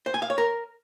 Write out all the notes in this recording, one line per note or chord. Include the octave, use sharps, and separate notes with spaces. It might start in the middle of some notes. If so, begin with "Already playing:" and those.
C5
G#5
F5
C#5
A#4